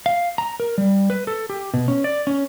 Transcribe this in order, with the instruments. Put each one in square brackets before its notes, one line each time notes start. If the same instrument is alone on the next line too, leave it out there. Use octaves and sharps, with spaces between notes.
[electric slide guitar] F5
A#5
A#4
G3
B4
A4
G4
B2
C#4
D5
C#4